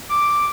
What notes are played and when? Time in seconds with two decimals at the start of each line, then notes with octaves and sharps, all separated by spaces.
0.09 D6